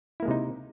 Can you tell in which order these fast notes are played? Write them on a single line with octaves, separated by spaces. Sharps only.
E4 A#3 G#3 C3 D#4